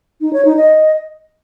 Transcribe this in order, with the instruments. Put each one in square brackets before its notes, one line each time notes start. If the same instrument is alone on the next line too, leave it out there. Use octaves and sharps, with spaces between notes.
[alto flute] D#4
C#5
D#4
D#5